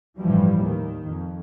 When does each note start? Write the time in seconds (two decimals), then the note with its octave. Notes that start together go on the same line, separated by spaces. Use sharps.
0.18 A1 G2 E3 F3 G3
0.60 D#2 D#3
1.07 F2